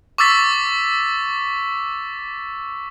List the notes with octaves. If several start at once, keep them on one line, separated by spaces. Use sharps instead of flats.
C#6 D6 E6 A6 B6